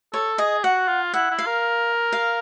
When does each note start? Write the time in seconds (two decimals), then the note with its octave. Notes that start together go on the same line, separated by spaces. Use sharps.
0.13 A4 C#5
0.38 G#4 D#5
0.64 F#4 F#5
0.88 F4
1.14 E4 F#5
1.31 E4
1.39 F5
1.46 A#4
2.12 F5